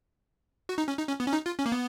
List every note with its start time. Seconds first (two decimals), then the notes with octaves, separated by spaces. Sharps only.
0.69 F#4
0.78 D#4
0.88 C#4
0.98 D#4
1.08 C#4
1.20 B3
1.28 C#4
1.33 D#4
1.46 F4
1.59 C#4
1.66 A#3
1.72 B3